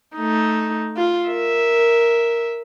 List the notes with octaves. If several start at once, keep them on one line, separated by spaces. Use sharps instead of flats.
A3 D#4
F4
A#4 E5